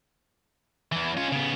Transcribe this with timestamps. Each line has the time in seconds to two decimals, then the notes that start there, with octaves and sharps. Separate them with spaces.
0.92 E2 E3
1.17 C#4 F4
1.32 C#3 B3